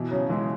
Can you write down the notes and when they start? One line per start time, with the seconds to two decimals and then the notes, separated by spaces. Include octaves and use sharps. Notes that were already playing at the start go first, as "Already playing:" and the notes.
Already playing: B2 E3
0.11 C#3 F#3
0.29 E3 G#3